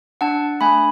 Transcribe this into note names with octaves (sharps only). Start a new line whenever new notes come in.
D4 F#5 A5
A3 G#5 B5